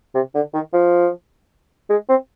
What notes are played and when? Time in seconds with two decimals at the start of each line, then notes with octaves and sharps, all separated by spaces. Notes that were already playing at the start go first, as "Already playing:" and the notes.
0.15 C3
0.35 D3
0.53 D#3
0.73 F3
1.90 G#3
2.09 C4